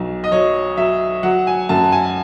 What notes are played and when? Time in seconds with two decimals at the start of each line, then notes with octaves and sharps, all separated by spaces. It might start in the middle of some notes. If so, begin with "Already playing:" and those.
Already playing: B1 F#3
0.24 D#5
0.32 F#3 C#5
0.77 F#3 E5
1.23 F#3 F#5
1.47 G#5
1.69 F#2 A5
1.92 G#5